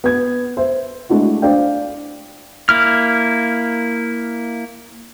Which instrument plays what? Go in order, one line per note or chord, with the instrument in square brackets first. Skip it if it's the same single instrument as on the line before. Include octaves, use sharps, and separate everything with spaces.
[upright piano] B3 G#6
C5 E5
G#3 A3 D4 E4 F#4
D4 C5 D5 F5 G5
[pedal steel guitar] A#3 E4 F6